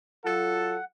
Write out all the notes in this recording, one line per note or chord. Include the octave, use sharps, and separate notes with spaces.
F#3 F4 A4 F#5